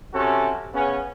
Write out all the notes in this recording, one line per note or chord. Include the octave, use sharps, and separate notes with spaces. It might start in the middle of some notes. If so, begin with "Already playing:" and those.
C3 C#4 F#4 A4
C#3 B3 C#4